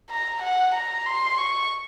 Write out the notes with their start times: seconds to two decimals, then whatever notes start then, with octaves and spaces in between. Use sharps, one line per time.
0.10 A#5
0.42 F#5
0.74 A#5
1.06 C6
1.38 C#6